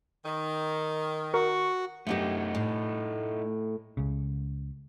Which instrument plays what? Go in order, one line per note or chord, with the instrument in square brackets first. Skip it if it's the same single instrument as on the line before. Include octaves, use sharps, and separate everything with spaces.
[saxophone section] D#3
[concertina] F#4 [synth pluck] A#4 [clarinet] C#6
[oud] F#2 B3 G4 [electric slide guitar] A3 D#4
[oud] A2
[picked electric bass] C#2 C#3